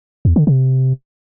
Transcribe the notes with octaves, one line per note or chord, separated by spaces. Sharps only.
E2
D3
C3